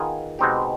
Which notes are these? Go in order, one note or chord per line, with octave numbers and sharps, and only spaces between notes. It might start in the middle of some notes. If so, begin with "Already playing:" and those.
Already playing: D#3 B3 F4 G#4
B2 G#3 C4 D#4 G4